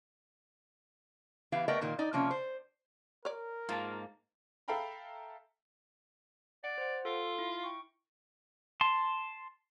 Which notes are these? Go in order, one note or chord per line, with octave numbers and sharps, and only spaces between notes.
E3 B3 E4 G4 F5
A3 B3 A#4 D5 D#5 G5
A#2 D#3 A#3
D#4 D5
C3 F3 A#3 C#4
C5
A#4 C#5 D5
G#2 A#3 F4 A5
A4 E5 F5 G5 A#5 B5
D5 F#5
C5 F#5
F4 A4
E4
G5 C#6
A5 C6